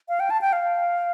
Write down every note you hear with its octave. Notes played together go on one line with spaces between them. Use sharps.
F5
G5
A5
G5
F5